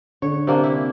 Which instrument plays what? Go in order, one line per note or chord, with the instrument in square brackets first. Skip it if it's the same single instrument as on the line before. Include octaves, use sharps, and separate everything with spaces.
[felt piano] D3 [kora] C#5
[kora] C3 A#3 D4
E4